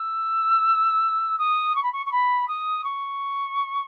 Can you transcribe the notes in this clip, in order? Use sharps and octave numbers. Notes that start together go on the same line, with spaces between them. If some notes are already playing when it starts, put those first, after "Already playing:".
Already playing: E6
D#6
C#6
B5
C#6
C#6
B5
D#6
C#6